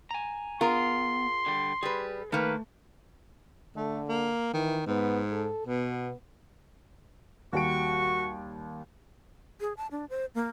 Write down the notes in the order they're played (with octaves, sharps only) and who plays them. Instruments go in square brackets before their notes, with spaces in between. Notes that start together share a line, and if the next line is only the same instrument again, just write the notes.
[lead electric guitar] G#5 A#5
[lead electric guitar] B3 [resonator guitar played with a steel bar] F4 G#4 A#4 [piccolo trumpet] C6
[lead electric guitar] D3 G3
[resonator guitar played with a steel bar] G3 B4 [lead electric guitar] G#4
[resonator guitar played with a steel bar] D#3 A#3 [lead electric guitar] A3 [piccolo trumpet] B4
[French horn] D3 [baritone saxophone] A3
[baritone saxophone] A#3
[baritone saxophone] D#3 [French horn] E3
[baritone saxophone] G#2 [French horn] B3
[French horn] A4
[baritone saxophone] B2 [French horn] B3
[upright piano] D#2 G3 D7 [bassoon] F#4 [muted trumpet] C#6
[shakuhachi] G#4
A5
D4
C5
A#3